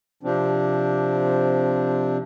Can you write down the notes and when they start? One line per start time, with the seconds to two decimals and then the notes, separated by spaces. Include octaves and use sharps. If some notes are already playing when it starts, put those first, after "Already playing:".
0.23 C3 F3 C4 D4